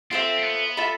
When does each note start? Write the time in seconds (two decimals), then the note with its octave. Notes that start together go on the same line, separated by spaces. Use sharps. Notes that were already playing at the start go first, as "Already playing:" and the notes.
0.11 C4 F4 A4 C5 E5
0.39 C4
0.44 B3
0.77 F4 A4 E5 B5